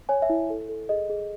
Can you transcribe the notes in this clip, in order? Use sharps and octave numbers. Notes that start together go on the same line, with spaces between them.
C#5 G#5
E5
E4
A4
A4
G#4 D#5
G#4